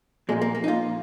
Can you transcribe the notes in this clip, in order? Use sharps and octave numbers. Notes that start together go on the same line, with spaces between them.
A#2 F3 G#3
A#3
A#3
D#4
F4